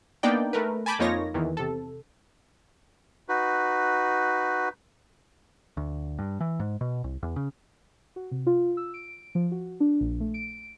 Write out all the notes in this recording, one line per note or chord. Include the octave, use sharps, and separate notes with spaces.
A#3 B3 D4 D#4 D5 G5
A3 A#4 B4
G#5 A5 B5 D6 G6
F2 A#3 D#4 F4 C#5 A#6
E2 D#3 E3
C3 A4
D#4 F#4 B4
D2
G2
E3
G#2
B2
C2
E2
C#3
F#4
C3
F4
E6
D7
F3
F#4
D4
A#1
A3
D7